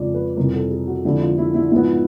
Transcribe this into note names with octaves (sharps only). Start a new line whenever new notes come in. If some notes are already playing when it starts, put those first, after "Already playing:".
Already playing: F2 C#3 F3 G#3 D5
B4
F2 C3 E3 G3 A#4
A4
G#4
F#4
F2 D3 F3 G#3 E4
F4
E4
E4
G#2 F3 G#3 B3 E4